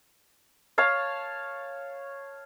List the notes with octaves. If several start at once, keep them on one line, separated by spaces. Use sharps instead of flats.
C#5 F5 A5